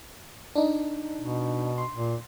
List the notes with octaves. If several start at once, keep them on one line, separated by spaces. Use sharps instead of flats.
D4 D#4
B2
C6
A#2